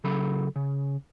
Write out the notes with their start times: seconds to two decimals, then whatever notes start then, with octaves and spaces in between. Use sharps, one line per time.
0.04 C#3 F#3 A4 B5
0.56 C#3